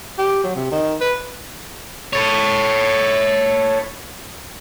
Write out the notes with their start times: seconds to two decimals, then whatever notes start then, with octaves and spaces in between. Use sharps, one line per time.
0.18 G4
0.44 F#3
0.56 C3
0.72 D#3
1.01 B4
2.13 A4 C#5